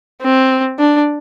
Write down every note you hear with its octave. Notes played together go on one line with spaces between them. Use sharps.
C4
D4